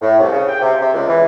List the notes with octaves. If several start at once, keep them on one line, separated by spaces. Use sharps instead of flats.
A2
C2
C#3
G5
C3
C3
C#2
E3